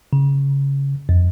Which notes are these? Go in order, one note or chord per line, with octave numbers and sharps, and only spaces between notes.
C#3
F2